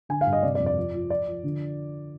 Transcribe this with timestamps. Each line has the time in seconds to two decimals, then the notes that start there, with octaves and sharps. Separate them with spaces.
0.09 D3 G#5
0.21 F5
0.26 G2
0.33 D#5
0.43 C3 D5
0.55 D5
0.60 F2
0.66 D5
0.78 F3
0.94 F3
1.10 F3 D5
1.28 F3
1.43 D3